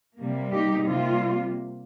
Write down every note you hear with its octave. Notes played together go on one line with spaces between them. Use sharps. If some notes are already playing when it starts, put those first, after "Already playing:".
C3 G3 A#3
D#4 G4
C3 G3 A#3 F4